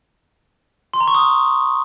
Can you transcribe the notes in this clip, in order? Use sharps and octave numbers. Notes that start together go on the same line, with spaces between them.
C6
A#5
C#6
D#6